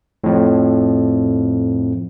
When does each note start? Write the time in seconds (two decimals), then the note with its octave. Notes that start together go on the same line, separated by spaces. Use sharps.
0.24 F2 A2